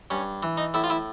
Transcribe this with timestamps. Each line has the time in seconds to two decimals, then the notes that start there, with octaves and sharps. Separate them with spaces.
0.10 G2 C#4
0.43 E3
0.57 D#4
0.74 A2 E4
0.84 F4
0.90 E4